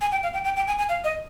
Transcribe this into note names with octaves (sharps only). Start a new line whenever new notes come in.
G#5
G5
F5
G5
G5
G5
G#5
G#5
F5
D#5